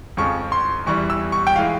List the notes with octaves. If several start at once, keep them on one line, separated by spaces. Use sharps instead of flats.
F2 C#3 F3 G#3 C#6
C6
E2 E3 G3 C#6
E6
C#6
G5
E3 G#3 F5